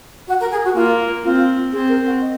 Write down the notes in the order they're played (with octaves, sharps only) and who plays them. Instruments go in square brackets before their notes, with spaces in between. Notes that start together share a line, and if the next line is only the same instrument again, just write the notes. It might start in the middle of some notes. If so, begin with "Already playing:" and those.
[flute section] F#4
A#4
G#4
F#4
[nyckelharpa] A#3 [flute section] F4
[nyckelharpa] C4 [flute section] F4
[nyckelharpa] C4 [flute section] G#4
[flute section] A#4
F#4
D#5